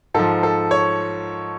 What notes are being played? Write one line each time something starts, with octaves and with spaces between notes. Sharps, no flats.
G#2 F3 A4
A4
C#5